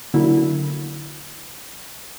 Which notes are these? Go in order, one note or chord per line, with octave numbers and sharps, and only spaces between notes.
D3 F#3 A#3 E4